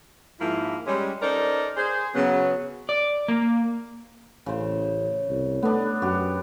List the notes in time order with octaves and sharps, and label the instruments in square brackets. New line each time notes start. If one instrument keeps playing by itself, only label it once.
[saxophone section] G#2 F3 A#3 E4
G3 G#3 C#4
C#4 D#4 A4 A#4 C5 D5
G#4 C5
C#3 F#3 B3
[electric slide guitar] D5
A#3
[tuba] A1 [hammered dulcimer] C#3 C5
[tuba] C2
[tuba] A3 [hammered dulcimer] B3 D4
[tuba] F#2 [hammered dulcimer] F#4 G4